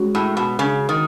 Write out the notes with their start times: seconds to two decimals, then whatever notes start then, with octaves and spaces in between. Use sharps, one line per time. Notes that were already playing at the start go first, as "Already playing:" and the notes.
Already playing: G#3 C#4 F#4
0.15 A2
0.37 B2
0.59 C#3
0.89 D#3